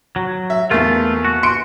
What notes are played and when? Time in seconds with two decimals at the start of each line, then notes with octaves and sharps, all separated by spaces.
0.16 F#3
0.50 E5
0.71 E2 A3 A#3 F4
1.25 F#4
1.43 C6 C#7 D7